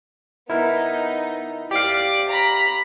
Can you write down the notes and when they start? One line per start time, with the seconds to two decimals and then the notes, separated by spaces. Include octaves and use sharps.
0.50 B3 D#4 E4 A#4
1.71 G4 D5 F5 D6
2.28 A#5 B5